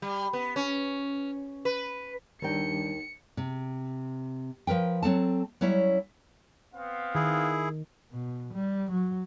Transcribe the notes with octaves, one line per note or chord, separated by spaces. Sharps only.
G3
B3
C#4
B4
D#2 D#3 G3 D4 A#4 G5 C#7
C3
F3 A#4 B4 G5
F#3 C4 A4 A5
F#3 G3 C#4 E4 C#5
B3 C4 F5
D#3 E4 G#4
B2
G3
F#3